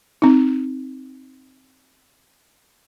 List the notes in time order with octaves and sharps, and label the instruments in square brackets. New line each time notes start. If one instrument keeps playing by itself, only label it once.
[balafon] C4 D#4